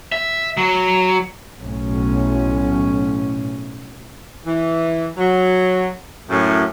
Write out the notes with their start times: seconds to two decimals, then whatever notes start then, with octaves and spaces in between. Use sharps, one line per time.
0.12 E5
0.57 F#3
1.59 B1 A2 C#4
4.45 E3
5.17 F#3
6.30 F#2 A2